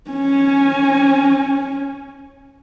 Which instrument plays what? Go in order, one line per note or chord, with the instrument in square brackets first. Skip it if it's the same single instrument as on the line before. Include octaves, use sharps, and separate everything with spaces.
[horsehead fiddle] C#4 G#5